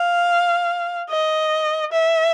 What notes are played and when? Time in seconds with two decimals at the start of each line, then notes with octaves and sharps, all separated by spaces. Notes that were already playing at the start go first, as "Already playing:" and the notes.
Already playing: F5
1.10 D#5
1.92 E5